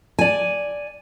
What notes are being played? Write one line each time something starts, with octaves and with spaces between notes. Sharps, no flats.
D5 G#5